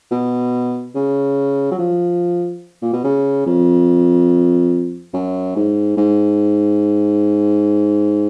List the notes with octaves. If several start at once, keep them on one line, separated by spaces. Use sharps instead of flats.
B2
C#3
F#3
F3
A#2
B2
C#3
F2
F#2
G#2
G#2